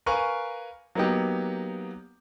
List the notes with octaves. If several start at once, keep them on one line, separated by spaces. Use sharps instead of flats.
A#4 B4 F5 G#5 C#6
F#3 A#3 B3 D#4 G4